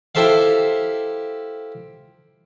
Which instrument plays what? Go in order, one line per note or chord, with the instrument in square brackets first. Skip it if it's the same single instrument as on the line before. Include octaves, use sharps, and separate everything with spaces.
[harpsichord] E4 G4 A4 C5 E5 F5